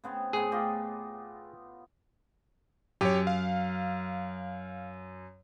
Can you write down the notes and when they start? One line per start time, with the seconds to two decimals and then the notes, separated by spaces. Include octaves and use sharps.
0.04 C#3 B3 C4
0.33 A2 B3 G#4
0.52 F4 G4 D#5
3.01 F#2 G4 C#5
3.27 F5